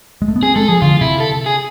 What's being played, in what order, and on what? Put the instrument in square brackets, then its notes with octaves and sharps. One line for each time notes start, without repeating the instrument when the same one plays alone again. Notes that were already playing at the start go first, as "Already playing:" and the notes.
[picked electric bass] G#3
A3
B3
[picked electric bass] C4 [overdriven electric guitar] G#4
[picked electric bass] G#3 [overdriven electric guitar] A4
[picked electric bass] F3 [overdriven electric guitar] G#4
[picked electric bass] D3 [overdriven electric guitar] F4
[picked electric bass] C3 [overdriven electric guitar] E4
[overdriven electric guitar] A4
G#4